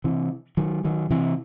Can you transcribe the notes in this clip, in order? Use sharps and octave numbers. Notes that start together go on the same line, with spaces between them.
C3 E3
D#3 F#3
D#3 F#3
C3 E3